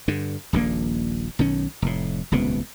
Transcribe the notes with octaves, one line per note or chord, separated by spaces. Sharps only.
G2 D3
D#1 A#1 A#2 A#3
B1 D#3 C#4
F1 A2
D#1 C#2 C3 B3